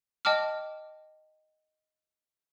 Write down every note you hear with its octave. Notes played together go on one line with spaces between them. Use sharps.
D#5 G5 A5 D6 F6